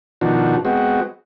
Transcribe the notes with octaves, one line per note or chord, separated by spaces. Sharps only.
B2 D#3 F3 D4 F#4
G#3 B3 C4 F#4